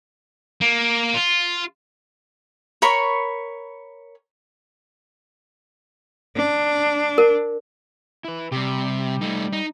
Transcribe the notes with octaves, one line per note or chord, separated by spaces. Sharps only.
A#3
F4
A#4 C#5 B5 C#6
D4
A#4
E4 B4
C3 G3 G4
A3 D#4
D#4